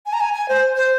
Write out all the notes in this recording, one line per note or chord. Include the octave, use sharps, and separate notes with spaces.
G#5
A#5
G#5
G#5
C5
C5